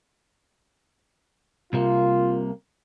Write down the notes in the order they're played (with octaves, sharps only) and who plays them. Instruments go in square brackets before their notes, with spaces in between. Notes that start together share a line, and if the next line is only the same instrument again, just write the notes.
[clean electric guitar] C2 C3 A#3 [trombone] F4